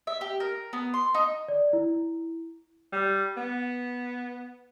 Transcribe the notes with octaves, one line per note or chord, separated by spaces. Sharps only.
E5
G4
A#4
B3
C6
D#4
D5
E4
G3
B3